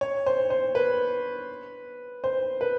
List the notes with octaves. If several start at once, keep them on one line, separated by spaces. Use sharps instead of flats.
C#5
C5
C5
B4
C5
B4